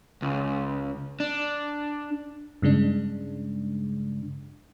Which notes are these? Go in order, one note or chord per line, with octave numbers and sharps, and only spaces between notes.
C#2
D4
G2 C#3 G#3 D4